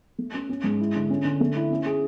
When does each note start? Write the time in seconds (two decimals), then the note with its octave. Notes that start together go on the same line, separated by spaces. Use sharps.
0.18 A3
0.34 C#4
0.49 C#4
0.64 G#2
0.80 E4
0.95 D3
1.09 C#4
1.25 D3
1.40 A3
1.56 E4
1.71 C#4
1.86 G#4